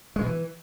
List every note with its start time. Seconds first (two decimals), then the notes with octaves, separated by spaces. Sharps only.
0.16 G#3
0.21 B2
0.26 E3